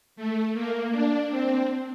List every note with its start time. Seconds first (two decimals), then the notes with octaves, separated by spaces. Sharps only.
0.16 A3
0.54 A#3
0.91 D4
1.30 C4